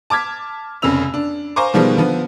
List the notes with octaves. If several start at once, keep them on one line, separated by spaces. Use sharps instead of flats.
A5 D6 F6 G#6 B6
F1 F2 C#3 C#4 E6 F7
D4
C5 F5 G#5 A#5 C#6 D6
B2 D#3 F3 G3 G#3 B3
D3 F3 B3